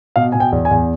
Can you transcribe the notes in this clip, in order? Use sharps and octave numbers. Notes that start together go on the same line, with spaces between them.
B2 F5
B2 G#5
G5
E2
G#5
E2